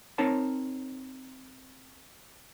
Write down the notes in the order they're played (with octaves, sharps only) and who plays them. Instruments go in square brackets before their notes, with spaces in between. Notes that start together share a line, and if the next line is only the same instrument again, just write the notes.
[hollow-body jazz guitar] C4 D#4 A#4 C#5 A5